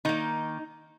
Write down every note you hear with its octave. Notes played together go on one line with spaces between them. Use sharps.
D#3 A#3 D#4